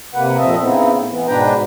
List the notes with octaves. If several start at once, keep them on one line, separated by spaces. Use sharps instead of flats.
C3 A#3 B4 F#5
F2 A#2 C4 D#5 E5 A5
C#3 B3 C4 D#4 E4
A2
E3 B3
G#2 B2 D4 B4 G5 A#5